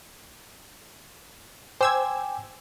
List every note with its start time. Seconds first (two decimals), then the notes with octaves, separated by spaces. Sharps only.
1.81 C5 G5 G#5 D6 E6 G#6